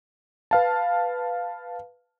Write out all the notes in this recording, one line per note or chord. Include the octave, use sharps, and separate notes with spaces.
B4 F5 A5